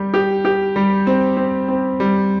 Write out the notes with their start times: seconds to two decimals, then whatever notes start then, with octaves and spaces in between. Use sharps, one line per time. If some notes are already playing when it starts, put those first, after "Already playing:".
Already playing: G3 G4
0.14 G4
0.45 G4
0.76 G3
1.07 C4
1.37 C4
1.68 C4
2.00 G3